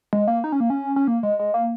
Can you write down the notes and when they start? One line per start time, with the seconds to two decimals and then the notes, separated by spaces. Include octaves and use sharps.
0.13 G#3
0.28 A#3
0.44 D#4
0.52 C#4
0.60 A#3
0.70 C#4
0.96 C#4
1.07 A#3
1.23 G#3
1.39 G#3
1.54 A#3